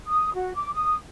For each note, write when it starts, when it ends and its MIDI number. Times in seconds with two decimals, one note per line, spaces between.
0.07 0.32 87
0.34 0.53 66
0.55 0.71 86
0.73 0.95 87